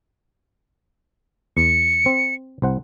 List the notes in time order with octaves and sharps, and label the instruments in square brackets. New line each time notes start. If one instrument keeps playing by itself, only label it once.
[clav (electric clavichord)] E2 [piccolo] C#7
[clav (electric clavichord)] C4
C2 C5 F#5